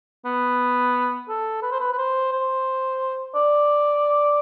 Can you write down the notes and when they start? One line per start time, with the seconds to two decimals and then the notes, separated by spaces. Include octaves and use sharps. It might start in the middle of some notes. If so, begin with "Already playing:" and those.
0.25 B3
1.29 A4
1.62 B4
1.72 C5
1.80 B4
1.93 B4
1.98 C5
2.32 C5
3.35 D5